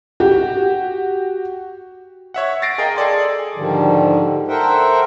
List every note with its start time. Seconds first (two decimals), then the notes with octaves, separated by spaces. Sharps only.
0.20 F#4 G4
2.34 C#5 E5 F#5
2.62 A6 A#6 C7 D7
2.78 G#4 A#4 D#5 F5 G5
2.96 G#4 A4 D5 C6
3.55 G#2 D3 D#3 F3 G3
4.48 A4 A#4 C5 E5 F#5 G5